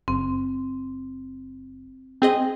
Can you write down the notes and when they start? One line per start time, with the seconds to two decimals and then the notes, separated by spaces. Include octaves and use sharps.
0.08 F#1 C4
2.22 C4 G#4 D#5